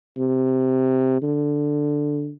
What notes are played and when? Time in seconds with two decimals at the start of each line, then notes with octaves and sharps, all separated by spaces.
0.18 C3
1.22 D3